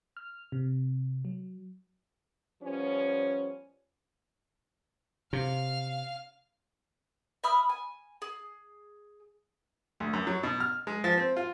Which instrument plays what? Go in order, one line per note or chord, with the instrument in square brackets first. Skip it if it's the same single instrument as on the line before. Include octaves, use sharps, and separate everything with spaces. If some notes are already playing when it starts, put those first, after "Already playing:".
[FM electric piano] F6
C3
F#3
[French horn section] F3 G3 B3 C#4
[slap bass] C3 [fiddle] F5 F6
[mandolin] E5 B5 D#6 F6
G#5
G#4
[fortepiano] D2
F#2
F#3
B2
F6
G#3
F3
C4
F4